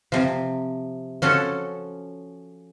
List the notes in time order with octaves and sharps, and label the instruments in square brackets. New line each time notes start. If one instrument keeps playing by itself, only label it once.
[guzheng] C3 F3
F3 C#4 F#4 A4